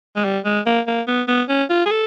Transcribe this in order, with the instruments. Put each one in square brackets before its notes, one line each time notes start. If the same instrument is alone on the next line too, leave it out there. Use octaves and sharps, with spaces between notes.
[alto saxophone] G#3
G3
G#3
A#3
A#3
B3
B3
C#4
F4
G#4
A4